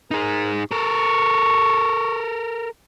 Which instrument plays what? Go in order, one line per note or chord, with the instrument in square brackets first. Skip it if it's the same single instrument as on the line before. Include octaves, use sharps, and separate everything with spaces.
[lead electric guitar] D#4 G#4 [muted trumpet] A#4
[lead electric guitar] A4 A#4 [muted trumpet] C#6